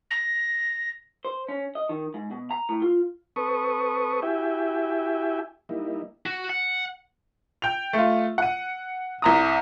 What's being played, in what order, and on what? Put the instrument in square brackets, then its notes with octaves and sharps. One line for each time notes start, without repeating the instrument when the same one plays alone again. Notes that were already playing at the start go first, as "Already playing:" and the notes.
[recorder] A#6
[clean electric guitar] C5
C#4
D#5
D#3
G#2
B2
A#5
A2
F4
[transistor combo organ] C4 A4 B4 C#6 D#6
E4 F#4 G4 E5 G5 G#5
G3 A#3 D#4 E4
[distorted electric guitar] F#4
F#5
[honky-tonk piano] G5 F7
A3 F4
F#5 D#7
C2 A#5 D#6